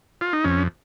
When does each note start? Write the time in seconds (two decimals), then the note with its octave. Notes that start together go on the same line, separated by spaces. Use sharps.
0.21 F4
0.33 D#4
0.44 F2 C#4